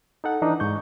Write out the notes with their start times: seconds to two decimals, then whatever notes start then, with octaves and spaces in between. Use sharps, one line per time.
0.24 D#4 A4 F#5
0.42 E3 D4 D#4
0.60 G#2 C#6 G6